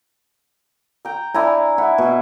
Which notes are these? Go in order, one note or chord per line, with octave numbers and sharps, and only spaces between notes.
G5 A#5
D4 E4 G#5 A#5
E4 F#5
B2